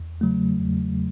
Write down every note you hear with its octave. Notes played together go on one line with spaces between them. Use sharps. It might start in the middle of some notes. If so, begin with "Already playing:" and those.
Already playing: E2
C#3 F#3 A3
E2